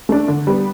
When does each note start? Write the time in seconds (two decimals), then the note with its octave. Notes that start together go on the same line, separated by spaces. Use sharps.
0.09 A3 D4
0.28 D3
0.47 G3 B3